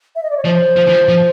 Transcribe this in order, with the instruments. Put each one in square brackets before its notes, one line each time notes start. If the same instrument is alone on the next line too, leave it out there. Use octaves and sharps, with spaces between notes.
[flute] E5
D#5
D5
C#5
[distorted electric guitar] F3 [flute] C5
[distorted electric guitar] F3
E3
F3
F3